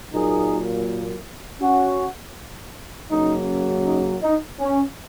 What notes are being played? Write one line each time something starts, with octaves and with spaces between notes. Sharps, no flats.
A#2 F#3 A#3 D#4 G#4
C#4 F#4
F#2 C#3 F#3 A#3 D#4
D#4
D#4
C#4